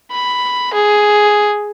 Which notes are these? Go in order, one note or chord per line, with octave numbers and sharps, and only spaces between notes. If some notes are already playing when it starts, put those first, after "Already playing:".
B5
G#4